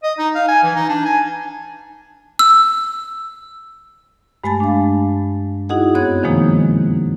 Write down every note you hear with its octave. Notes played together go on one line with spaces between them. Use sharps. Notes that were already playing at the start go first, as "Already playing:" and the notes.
D#5
D#4
F5
G#5
E3
D#4
D4
G#5
E6
G2 G#3 A3 G#5 A5 A6
D4 F5
D#4 E4 F#4 G#4 D#5 F#5
F#2 B3 C4 C#5 F#6 G#6
C3 D#3 F3 G#3 A#3 D#4